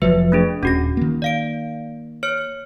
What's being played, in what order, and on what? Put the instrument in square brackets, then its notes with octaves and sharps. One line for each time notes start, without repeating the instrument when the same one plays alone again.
[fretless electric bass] F1 F3 F#3 [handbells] B4 E5
[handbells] A3 D4 G#4
[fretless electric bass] D#1 [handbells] C#4 F#4 A#6
[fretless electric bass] D#3 A#3
[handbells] D5 F5 D7
C#5 F6 C#7